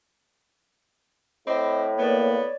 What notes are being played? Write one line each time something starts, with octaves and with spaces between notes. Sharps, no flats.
A2 C4 D#5 B5 D6
A#3 B3 C#5 D5